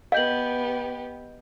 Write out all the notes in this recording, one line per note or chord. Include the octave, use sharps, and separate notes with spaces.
B3 G4 D#5 F5 G6 F#7